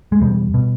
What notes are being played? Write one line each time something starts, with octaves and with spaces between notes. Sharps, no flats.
G#3
E2 B2 G3
B2